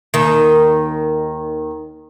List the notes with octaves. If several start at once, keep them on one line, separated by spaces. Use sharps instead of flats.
D#2 D#3